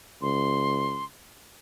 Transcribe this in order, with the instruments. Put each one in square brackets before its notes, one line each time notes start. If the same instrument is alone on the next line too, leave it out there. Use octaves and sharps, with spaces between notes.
[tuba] C#2 [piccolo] C6